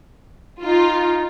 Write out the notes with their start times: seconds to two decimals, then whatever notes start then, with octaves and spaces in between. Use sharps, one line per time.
0.63 D#4 F4